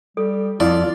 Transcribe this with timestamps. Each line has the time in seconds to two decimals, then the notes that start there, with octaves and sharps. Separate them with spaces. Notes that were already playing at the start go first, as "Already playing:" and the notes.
0.17 G3 A4
0.60 F2 E4 F4 D5